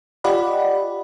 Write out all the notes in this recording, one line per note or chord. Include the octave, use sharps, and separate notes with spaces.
F4 G4 D5 D#5 F#5 B5